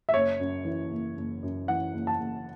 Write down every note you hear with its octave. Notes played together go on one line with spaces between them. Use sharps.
E5
F#1 C#5
F#2
E3
F#1
F#1
F#2
E3 F#5
F#1
A5
F#1